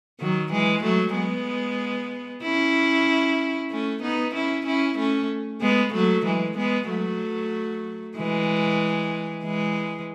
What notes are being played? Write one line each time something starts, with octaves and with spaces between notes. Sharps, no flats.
D#3 F#3
E3 G#3
F#3 A3
G#3 B3
C#4 E4
A3 C#4
B3 D#4
C#4 E4
C#4 E4
A3 C#4
G#3 B3
F#3 A3
E3 G#3
G#3 B3
F#3 A3
E3 G#3
E3 G#3